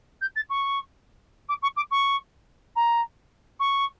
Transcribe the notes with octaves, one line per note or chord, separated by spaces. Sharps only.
G6
A6
C#6
D6
C#6
D6
C#6
A#5
C#6